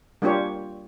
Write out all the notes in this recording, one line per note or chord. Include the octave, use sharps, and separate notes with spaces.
G3 A#3 D4 F4 G4 C#5